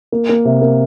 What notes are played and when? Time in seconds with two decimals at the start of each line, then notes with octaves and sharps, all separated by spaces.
0.12 A#3
0.29 A#3
0.45 C3
0.62 A#3